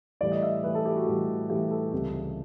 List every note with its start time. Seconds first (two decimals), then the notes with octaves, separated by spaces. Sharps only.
0.21 A2 E3 G3 D5
0.32 D#5
0.43 E5
0.64 A2 E3 G3 B4
0.75 A4
0.86 G4
0.96 F#4
1.07 A2 E3 G3
1.50 A2 E3 G3 G4
1.71 A4
1.92 C#2 C3 E3 G3